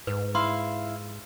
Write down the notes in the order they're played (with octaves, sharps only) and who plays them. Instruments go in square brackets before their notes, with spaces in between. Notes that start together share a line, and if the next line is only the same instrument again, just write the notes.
[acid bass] G#2 [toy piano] B4
[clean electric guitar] E4 [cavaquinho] F5 [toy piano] C6